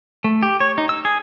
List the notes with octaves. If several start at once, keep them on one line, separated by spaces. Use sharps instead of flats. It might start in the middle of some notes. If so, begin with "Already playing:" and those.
A3
G4
C#5
D#4
E6
G#4